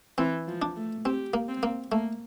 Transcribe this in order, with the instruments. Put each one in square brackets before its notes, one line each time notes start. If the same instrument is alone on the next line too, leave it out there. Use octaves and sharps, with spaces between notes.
[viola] E3 [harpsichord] C4
[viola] F3
[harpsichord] D4
[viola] A3
[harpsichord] C4 [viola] G4
[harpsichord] A#3
[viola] C4
[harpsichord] A#3
[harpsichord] A3 [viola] A#3